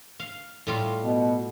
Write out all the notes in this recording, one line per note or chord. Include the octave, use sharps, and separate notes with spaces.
F5
A2 G3 F4
B2 B3